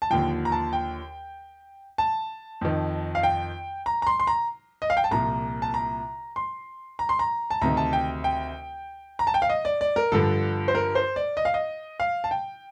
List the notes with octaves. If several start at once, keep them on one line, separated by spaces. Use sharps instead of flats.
A5
D#2 D3 F3 G5
A#5
A5
G5
A5
F2 D#3
F5
G5
A#5
A#5
C6
C6
A#5
D#5
F5
G5
A5
C2 A#2 F3 A#5
A5
A#5
C6
A#5
C6
A#5
A5
D2 C3 D#3 A#5
A5
G5
G5
A#5
A5
G5
F5
D#5
D5
D5
A#4
G2 D3 F3 A4
C5
A#4
C5
D5
D#5
F5
D#5
F5
A5
G5